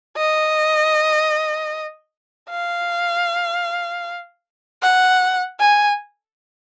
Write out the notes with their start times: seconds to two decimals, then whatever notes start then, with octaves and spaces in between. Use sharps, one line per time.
0.17 D#5
2.50 F5
4.83 F#5
5.60 G#5